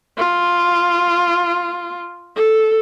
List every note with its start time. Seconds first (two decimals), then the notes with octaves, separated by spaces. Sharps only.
0.18 F4
2.36 A4